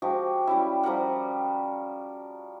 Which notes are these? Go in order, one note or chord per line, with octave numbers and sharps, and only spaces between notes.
F3 G#3 F#4 G4
G3 C#4 E4
F3 G3 A#4 F#5